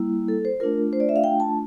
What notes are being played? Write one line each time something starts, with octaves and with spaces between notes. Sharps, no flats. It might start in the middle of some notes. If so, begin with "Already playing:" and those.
Already playing: G3 A#3 E4
A4
C5
A3 D4 F4 A#4
C5
D5
E5
F5
G5
A5